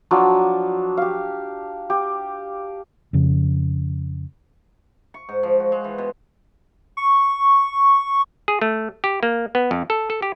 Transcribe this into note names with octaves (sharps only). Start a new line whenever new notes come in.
F3 F#3 D4
G4 F5
G4
F2 C#3
C#6
G#2
F3
F#4
G#3
E3
B2
C#6
G#4
A3
G4
A#3
B3
F2
A4
A4
G4